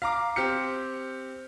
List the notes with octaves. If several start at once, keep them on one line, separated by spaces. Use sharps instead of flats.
F5 A#5 D6
C4 G4 F6 C#7